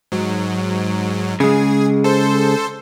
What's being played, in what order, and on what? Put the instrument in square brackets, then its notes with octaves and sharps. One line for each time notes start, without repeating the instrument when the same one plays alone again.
[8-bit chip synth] G#2 F#3
[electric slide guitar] C#3 G#3 [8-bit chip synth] G#4
[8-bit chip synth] A4 C5